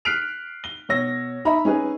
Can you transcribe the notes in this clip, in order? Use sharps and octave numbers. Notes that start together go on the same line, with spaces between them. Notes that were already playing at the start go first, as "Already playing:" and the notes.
F6 F#6 B6 C7 D7 F7
G7
B2 C#5 E6 A#6
D#4 D#5 E5 A#5 B5
C#4 D#4 G#4 B4